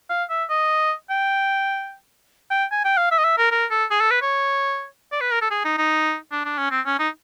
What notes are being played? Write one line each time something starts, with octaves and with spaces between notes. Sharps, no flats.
F5
E5
D#5
G5
G5
G#5
G5
F5
E5
D#5
E5
A#4
A#4
A4
G#4
A4
B4
C#5
D5
B4
A#4
A4
G#4
D#4
D#4
D4
D4
C#4
C4
C#4
D#4